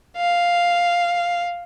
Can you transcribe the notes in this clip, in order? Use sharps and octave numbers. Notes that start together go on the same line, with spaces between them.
F5